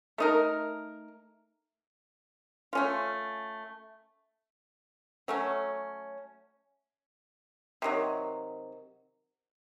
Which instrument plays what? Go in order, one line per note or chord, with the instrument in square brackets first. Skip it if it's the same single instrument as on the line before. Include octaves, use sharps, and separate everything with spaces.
[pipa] A3 D#4 A#4
A3 C#4 F4
F#3 A3 C#4
C3 D#3 F#3